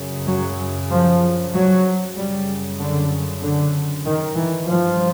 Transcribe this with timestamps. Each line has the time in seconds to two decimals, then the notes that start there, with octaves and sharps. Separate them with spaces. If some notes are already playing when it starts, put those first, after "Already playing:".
Already playing: F#2 C#3
0.27 F#3
0.90 F3
1.53 F#3
2.15 F#2 C#3 G3
2.79 D3
3.42 D3
4.05 D#3
4.36 E3
4.67 G2 F3